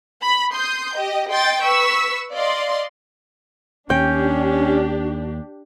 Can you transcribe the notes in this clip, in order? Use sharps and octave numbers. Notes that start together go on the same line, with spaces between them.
B5
C6 D#6 G6
G4 D#5
D#5 G5 C6 G6 A6
B4 C#6 E6 B6
D5 D#5 F5 C6
D#2 C#4 D4 G4 G5